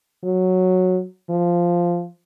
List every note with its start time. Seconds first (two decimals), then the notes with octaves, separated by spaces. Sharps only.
0.24 F#3
1.30 F3